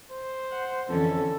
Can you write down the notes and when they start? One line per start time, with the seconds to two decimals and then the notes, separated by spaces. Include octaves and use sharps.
0.12 C5
0.52 F#5
0.89 F2 D3 E3 C#4 A4